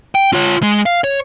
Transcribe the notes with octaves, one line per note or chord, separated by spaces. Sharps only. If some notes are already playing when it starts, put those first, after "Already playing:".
G5
F4 C#5
G#3
F5
C#5